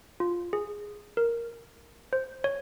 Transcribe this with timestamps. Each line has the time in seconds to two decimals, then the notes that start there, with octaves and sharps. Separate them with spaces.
0.20 F4
0.53 G#4
1.17 A#4
2.13 C5
2.44 C#5